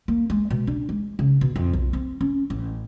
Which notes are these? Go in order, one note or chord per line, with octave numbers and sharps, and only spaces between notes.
A#3
G#3
B2
D4
G#3
C#3
B2
F2
B1
C4
C#4
A1